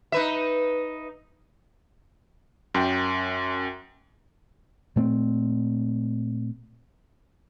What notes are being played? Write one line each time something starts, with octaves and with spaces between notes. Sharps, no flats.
D#4 B4 E5
F#2 G5
A#2 A3 C4